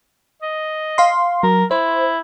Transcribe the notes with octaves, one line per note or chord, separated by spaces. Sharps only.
D#5
F5 C6
F#3 A#4
E4 C5